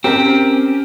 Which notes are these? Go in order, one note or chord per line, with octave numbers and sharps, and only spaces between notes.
C4 C#4 G4 A#4 G5